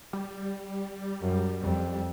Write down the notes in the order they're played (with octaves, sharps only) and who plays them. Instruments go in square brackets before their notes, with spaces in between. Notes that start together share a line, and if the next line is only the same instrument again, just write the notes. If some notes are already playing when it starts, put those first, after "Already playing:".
[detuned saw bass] G3
[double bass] F#2
F2